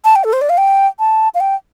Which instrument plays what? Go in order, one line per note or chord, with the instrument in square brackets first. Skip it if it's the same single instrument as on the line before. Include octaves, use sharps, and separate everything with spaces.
[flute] A5
G5
A4
C5
D5
F5
G5
A5
F5
G5